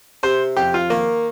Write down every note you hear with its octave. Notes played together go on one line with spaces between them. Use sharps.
C3 C5
F2 G4
F4
D#3 A#3